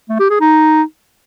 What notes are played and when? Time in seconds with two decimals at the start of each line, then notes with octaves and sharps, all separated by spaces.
0.09 A3
0.20 G4
0.30 G#4
0.41 D#4